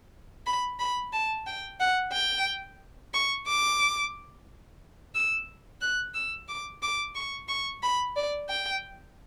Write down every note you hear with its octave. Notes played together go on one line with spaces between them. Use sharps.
B5
B5
A5
G5
F#5
G5
C#6
D6
E6
F#6
E6
D6
D6
C#6
C#6
B5
D5
G5